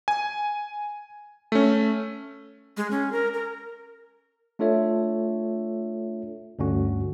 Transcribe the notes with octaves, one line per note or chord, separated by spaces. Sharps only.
G#5
A3 C#4
G#3
C#4
A#4
A#4
A3 D4 F4 A4 C#5 E5
D2 G2 D3 C#4 F#4